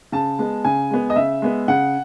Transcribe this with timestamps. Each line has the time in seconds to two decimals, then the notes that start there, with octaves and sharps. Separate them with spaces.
0.12 C#3 A5
0.39 G#3 B3
0.65 C#3 G#5
0.91 G#3 B3
1.10 D#5
1.16 C#3 E5
1.42 G#3 B3
1.68 C#3 F#5